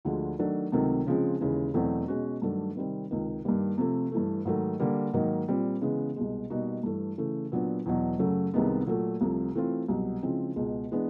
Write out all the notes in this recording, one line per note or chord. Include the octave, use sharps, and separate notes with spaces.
D2 D3 F3 G#3
D#3 F#3 A3 D4
C#2 C3 D#3 F#3 A3
C#3 F3 G#3 C4
D#2 C#3 E3 G#3
E2 B2 F#3 A3 C4
B2 G#3 C#4 F#4
G2 D#3 F#3 A3 D4
C3 D#3 G3 C4
C#2 C3 D#3
G2 D#3 G3 A#3
C3 F3 A3
G2 E3 A3
G#2 D#3 F#3 A3
D3 G3 A#3
G#2 D#3 F#3 A#3 D#4
A#2 G3 C4
C#3 E3 G#3 B3
C2 B2 G#3
B2 G3 A#3 D#4 F#4
G2 E3 A3
C#3 E3 A3
A#2 F#3 B3 D4
E2 B2 F#3
F#2 C#3 F#3 A3
C2 C3 D#3 G#3 B3
A#2 F#3 A3
C2 C3 F3 A3
E3 A3 C4 F4
C2 B2 F#3
C#3 F3 G#3 C4 E4
C#2 B2 G#3
E3 G#3 B3 D4